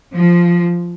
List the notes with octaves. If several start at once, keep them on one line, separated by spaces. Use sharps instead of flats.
F3